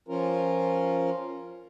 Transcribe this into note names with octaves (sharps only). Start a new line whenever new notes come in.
F3 C#4 F4 A#4